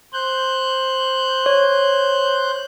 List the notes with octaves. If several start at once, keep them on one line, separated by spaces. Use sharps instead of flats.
C5 F#6 G6
C#5